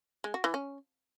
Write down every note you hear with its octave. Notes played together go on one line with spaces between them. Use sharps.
G#3
F#4
E3
C#4